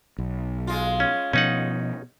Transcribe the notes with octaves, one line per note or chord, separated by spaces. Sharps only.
B1
G#3 F4
C#4
B2 F3 C#4 D#4 F#5